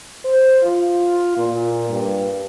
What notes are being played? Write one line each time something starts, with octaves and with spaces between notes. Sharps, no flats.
C5
F4
A#2
G2